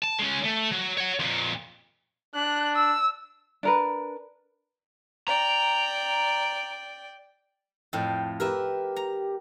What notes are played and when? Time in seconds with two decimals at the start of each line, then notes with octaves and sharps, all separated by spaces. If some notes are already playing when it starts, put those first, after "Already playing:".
0.04 A5
0.20 G#3 C#4
0.46 A3
0.72 F#3
0.98 C#5 F#5
1.20 F2 A#2
2.35 D4 F#6
2.76 E6
3.63 D4 A#4 B4
5.28 D5 G5 A#5
7.93 F2 A2 G5
8.40 G4 A#4 B4 E5
8.96 A#5